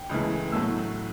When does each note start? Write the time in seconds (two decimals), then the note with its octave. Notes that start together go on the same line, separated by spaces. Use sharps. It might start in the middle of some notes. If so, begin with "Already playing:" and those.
Already playing: G5
0.09 C#2 C#3 E3 A3
0.52 A2 F#3 A3 E6